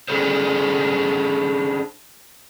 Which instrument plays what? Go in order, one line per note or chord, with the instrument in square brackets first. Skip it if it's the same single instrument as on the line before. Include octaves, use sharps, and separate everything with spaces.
[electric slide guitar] C#4 D4 G#4 A4 C5